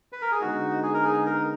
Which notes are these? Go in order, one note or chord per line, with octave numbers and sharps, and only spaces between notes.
B4
A#4
G#4
D3 G#3 B3 D#4 F#4
G#4
A#4
G#4
A#4